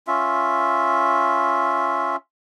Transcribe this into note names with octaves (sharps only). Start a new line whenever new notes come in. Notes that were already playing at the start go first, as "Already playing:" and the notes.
C#4 F4 E5